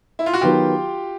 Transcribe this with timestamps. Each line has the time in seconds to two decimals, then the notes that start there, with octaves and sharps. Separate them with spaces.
0.19 E4
0.26 F4
0.34 F#4
0.41 D#3 F#3 B3 F4 G4